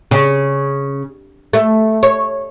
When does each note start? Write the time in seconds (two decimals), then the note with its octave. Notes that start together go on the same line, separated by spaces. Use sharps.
0.11 C#3
1.53 A3
2.03 C#5